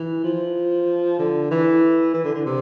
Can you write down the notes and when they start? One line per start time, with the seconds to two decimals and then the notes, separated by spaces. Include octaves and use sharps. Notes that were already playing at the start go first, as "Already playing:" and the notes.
Already playing: E3
0.24 F3
1.19 D3
1.51 E3
2.14 E3
2.24 D3
2.35 D3
2.46 C3